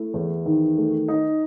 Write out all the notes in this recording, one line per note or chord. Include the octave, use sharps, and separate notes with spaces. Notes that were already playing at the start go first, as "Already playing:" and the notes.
Already playing: A3 E4
E2
D#3
A3
D#4